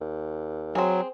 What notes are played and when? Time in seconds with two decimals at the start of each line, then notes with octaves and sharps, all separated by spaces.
0.01 D#2
0.75 F#3 C4 G#4